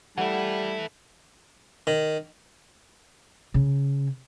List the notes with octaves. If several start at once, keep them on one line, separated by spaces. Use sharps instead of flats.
E3 G3 A3 E4 F#5
D#3
C#3